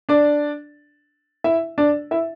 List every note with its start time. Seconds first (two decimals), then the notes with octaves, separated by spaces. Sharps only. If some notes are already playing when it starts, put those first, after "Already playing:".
0.09 D4 D5
1.44 E4 E5
1.78 D4 D5
2.11 E4 E5